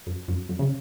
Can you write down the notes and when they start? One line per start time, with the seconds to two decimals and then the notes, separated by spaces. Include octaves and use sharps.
0.07 F#2
0.28 F#2
0.49 F#2
0.59 C#3